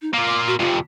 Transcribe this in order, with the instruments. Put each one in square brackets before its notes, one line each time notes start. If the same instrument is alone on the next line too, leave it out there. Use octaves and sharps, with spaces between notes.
[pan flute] D#4
[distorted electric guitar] A#3 F4 [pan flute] D6
[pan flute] D6
F#4
[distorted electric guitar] F2 C3 [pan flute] F4